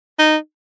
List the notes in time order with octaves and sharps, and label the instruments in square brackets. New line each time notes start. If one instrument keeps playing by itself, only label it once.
[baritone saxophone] D#4